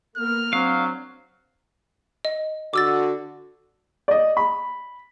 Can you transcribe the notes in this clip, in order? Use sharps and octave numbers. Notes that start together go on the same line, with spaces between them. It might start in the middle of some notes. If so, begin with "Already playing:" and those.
A#3 B3 A#4 F6
F#3 C4 D4 F5
D#5
D3 F#4 D6 E6 A6
D5 D#5
B5